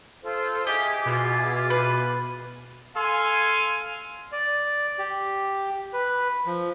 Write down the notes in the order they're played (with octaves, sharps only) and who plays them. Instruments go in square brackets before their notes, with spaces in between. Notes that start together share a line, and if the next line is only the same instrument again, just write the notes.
[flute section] F4 A4 C5
[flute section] E4 G#4 D6 [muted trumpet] G4 [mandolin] D#5
[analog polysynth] B2 [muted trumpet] F4
[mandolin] B4
[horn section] A4 F5 G#5 C6
[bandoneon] D5
G4
B4
F3